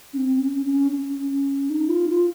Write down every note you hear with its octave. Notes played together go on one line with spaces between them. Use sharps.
C#4
C4
C#4
C#4
C#4
D#4
F4
F4